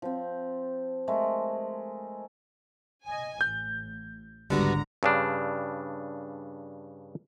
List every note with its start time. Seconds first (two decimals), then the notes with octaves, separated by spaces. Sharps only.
0.02 F3 C4
1.08 G#3 A3 A#4
3.06 D#5 G#5
3.41 A1 G6
4.50 G#1 C#2 D3 G3 B3 F#4 A#5
5.03 G2 C#3 D4